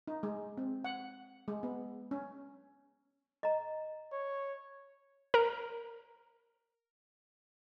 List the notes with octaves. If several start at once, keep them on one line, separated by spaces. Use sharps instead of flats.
D#4
G#3
C4
F#5
G#3
B3
C#4
D#5 A#5
C#5
A#4 A#5